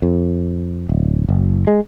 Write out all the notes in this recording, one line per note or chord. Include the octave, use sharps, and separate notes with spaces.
F2
D1
F#1
G#3